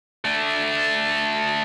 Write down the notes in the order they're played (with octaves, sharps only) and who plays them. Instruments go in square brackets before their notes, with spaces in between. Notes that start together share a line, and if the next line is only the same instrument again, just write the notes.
[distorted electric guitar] A3 D4